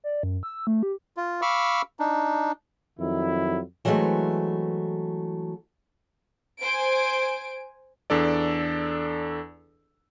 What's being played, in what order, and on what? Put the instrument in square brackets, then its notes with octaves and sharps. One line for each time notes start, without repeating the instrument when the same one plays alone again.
[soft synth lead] D5
F#2
E6
A3
G4
[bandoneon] F4
F5 B5 C#6 D6 E6 F6
D4 D#4
[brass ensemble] F2 D#3 F#3 E4
[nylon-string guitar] E3 F#3 G#3 A3 C4
[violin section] C5 G#5 D7
[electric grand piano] E2 D4 A4 D5